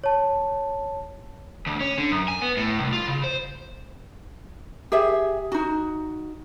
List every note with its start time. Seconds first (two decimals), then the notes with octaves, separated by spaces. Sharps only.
0.04 C#5 A5
1.67 D2
1.81 C#4
1.98 D3
2.11 F#2
2.28 G#5
2.41 B3
2.57 A2
2.78 C2
2.93 F4
3.07 C#3
3.24 C5
4.92 G4 G#4 E5
5.52 D#4 F#4